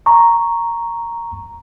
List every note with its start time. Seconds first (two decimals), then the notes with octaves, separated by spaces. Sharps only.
0.06 A#5 C#6